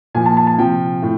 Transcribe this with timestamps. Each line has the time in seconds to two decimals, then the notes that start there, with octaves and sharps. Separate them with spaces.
0.14 A#2 F3 G#5
0.26 A5
0.37 A5
0.47 A5
0.58 C3 F3 G5
1.03 A2